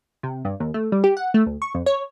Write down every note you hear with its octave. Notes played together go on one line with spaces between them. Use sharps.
C3
G2
D#2
A3
G3
G4
F#5
A3
D2
C#6
F2
C#5